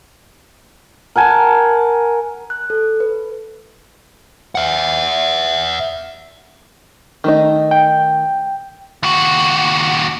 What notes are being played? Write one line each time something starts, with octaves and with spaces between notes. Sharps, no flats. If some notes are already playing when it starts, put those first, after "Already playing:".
A#4 F#5 G#5 A5
F#6
A4
B4
E5 F#5
D#3 A3 D#4
G5
D#2 F#4